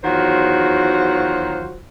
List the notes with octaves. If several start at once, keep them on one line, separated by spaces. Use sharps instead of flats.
E2 D#3 F#3 F4 F#4 C5